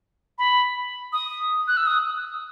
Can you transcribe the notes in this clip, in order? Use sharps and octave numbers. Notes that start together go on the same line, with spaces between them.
B5
D#6
F#6
E6
D#6